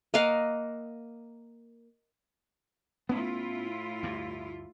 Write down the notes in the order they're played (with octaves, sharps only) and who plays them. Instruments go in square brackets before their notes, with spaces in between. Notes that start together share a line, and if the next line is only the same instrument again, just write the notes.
[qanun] A#3 D#5 F5 F#5
[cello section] A2 E4 F4 [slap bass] B3 C#4
[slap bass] D2 G2